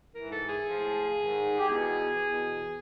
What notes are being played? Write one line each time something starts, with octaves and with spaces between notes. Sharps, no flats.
G#2 E3 A#4
A4
G#4
A2 F3
G#2 D#3
G4
E2 B2 G#4
E2 B2